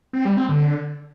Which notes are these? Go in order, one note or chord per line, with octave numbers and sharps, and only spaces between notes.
C4
G3
C4
D3